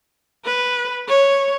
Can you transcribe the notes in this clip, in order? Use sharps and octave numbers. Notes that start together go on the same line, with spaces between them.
B4
C#5